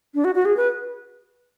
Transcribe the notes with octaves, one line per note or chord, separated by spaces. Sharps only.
D4
F#4
F#4
G#4
B4